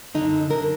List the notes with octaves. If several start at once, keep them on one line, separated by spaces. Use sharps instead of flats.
F#2 D3 D#4
D3 A#4